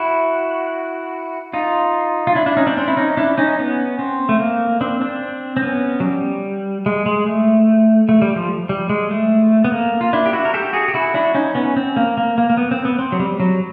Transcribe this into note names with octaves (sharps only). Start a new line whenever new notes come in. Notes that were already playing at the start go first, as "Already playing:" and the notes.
Already playing: E4 F#4
D#4 F4
F4
D4 E4
D4 E4
C#4 D#4
C4 D4
C4 D4
E4
C#4 D#4
D4 E4
C#4 D#4
B3 C#4
C4
A3
A#3
C4 D4
C4 D4
C4
B3 C#4
F#3
G3
G#3
G#3
A3
A3
G3
F3
G3
G#3
A3
B3
A#3
F4
D4 E4
G4
E4 F#4
A#4
G4 A4
F#4 G#4
G4
E4 F#4
D4 E4
C#4 D#4
B3 C#4
C4
A#3
A#3
A#3
A#3
B3
C4
B3
C4
F#3
G3
F#3